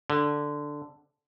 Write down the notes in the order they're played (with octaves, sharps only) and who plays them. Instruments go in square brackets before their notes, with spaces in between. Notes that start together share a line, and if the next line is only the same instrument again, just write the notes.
[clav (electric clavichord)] D3